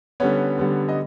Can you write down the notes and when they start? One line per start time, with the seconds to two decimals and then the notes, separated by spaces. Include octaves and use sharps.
0.20 D3 G3 B3 C#4 C#5
0.58 D3 G3 B3
0.89 D#5